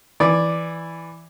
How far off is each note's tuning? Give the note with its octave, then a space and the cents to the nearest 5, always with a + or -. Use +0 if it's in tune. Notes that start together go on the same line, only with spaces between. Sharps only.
E3 +0 D5 +0